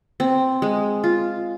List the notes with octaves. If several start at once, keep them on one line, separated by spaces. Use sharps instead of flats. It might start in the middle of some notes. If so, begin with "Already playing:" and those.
C4
G#3
F4